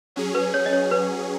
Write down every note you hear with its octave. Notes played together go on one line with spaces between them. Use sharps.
F#3 C#4 G#4
B4
C#5
D#5
C#5
B4